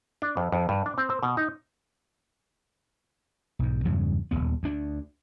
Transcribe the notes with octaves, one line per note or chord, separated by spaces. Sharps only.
D4
F2
F2
G2
D4
C4
C4
B2
D#4
B1 G#2
E2 G2 C#3 F#3
D#1 A#1 D#2 B3
D2 D4